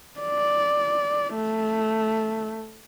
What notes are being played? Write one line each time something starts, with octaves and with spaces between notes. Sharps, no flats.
D5
A3